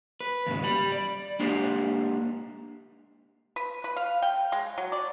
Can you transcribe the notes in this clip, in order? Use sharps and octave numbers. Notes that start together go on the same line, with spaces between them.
B4
D#2 G#2 C#3
G3 B5
D5
G#3 A#3 D4 G4 C5
B4
B4
F5
G5
G#3
F#3
D5